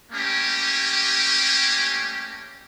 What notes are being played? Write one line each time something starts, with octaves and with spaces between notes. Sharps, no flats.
G3 A3 A#3 C#4 G4